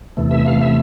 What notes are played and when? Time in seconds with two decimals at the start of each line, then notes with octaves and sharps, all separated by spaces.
0.17 E2 C3 E3 A3
0.31 E5
0.46 F5
0.61 E5